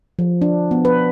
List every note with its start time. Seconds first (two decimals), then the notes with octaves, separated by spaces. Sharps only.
0.19 F3
0.42 D4
0.71 B3
0.85 B4